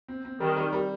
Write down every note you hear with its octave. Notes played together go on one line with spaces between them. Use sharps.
C4
C4
D#3 G3
G3
G3